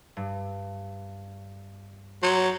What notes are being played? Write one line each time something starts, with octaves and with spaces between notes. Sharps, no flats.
G2
F#3 C6 G6